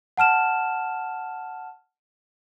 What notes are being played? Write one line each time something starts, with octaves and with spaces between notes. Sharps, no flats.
F#5 A5 F6 E7